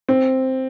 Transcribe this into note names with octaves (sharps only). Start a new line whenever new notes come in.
C4